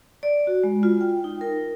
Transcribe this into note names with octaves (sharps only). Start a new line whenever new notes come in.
D5
F#4
G#3
F4
G5
D#4
A#4